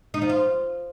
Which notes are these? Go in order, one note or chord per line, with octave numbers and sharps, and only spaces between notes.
D#4
F3
F4